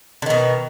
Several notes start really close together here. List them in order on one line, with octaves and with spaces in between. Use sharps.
D3 D#3 B2